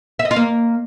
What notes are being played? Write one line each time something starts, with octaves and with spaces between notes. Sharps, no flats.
E5
D#5
F4
A#3